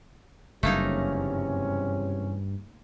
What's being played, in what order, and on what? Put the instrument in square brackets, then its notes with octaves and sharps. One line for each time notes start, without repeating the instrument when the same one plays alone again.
[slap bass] F#1 [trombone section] E2 C3 C#4 [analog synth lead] G2 [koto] A3 A#3 D#4